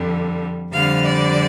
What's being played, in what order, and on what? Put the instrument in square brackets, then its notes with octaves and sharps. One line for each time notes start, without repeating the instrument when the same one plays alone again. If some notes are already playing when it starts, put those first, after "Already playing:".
Already playing: [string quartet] F2 D3 G3
F2 D3 G3 C4 F5
D5